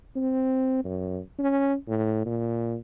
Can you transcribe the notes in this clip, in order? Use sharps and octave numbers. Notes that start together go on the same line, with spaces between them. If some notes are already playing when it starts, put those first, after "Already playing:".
C4
F#2
C#4
A2
A#2